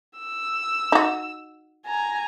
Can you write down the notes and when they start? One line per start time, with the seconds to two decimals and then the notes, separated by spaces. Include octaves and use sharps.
0.19 E6
0.92 D#4 F#4
1.86 G#5 A#5